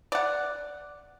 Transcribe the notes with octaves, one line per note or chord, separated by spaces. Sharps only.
D5 F#5